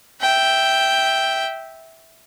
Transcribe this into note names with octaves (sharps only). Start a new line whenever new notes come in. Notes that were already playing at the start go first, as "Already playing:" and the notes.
E5 G5